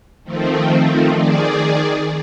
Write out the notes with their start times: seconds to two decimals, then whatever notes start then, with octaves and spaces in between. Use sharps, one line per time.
0.24 D#3 F3 A3 C4
1.16 D#3 G#4 D5